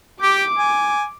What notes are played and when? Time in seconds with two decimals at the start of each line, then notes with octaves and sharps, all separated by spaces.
0.22 G4 D6
0.58 G#5